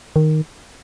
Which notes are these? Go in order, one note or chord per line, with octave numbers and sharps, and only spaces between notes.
D#3